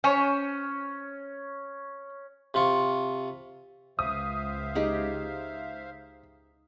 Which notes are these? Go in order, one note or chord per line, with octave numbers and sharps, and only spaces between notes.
C#4 C5 C#5 G#5
C3 F4 C#6
C#2 C5 E5 F5 D#6
D#4 G4 G#4